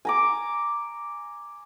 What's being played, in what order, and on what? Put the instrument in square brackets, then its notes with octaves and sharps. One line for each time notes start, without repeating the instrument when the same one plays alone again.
[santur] G#5 A#5 D6